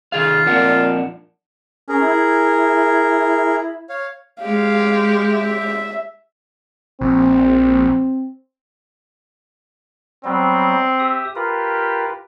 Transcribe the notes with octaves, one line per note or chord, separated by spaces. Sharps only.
D#3 F4 G#4 F5
F2 A#2 D4 F#5
C#4 G#4 A#4
E4
C#5 F5
G#3 G4 F5
E5
A#1 C4
F#3 G3 B3 C4
G4 E5 D#6
F4 G4 A#4 B4